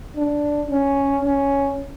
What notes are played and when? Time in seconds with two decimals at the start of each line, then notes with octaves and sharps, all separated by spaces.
0.16 D4
0.71 C#4
1.25 C#4